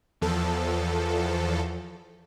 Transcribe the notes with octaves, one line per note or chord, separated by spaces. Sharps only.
E2 F3 A4